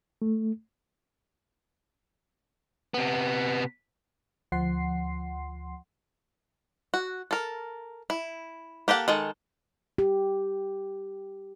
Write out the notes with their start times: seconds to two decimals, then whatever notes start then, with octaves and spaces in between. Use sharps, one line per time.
0.22 A3
2.94 C3 B3
4.52 D2 F3 F#5 C6 C7
6.94 F#4
7.31 A4 A#4
8.10 E4
8.88 A#3 G4 A4 F#5
9.08 D#3 G#3 A4
9.98 G4